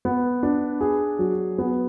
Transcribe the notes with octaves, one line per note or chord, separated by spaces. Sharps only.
B3
D4
G#4
F#3
B3